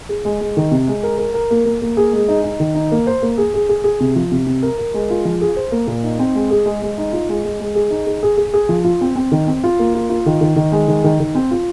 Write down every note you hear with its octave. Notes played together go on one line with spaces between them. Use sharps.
G#4
G#3
G#3
D#3
C3
G#3
A#4
A#4
A#4
A#3
A#3
A#3
G#4
G#3
D#4
D#4
D#3
D#4
A#3
C5
A#3
G#4
G#4
G#4
G#4
C3
F3
C3
C3
A#4
A#4
G#3
F4
F3
G#4
C5
A#3
A#2
D#4
C4
G#3
G#4
G#3
G#3
D#4
F4
G#3
G#3
G#3
G#4
D#4
G#4
G#4
G#4
G#4
F3
F4
C4
C4
D#3
C4
F4
A#3
F4
F4
D#3
D#3
D#3
G#3
D#3
D#3
D#3
C4
F4